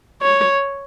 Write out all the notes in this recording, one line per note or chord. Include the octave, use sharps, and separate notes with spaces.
C#5